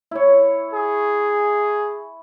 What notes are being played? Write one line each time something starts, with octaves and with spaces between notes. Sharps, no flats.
E4 C#5
G#4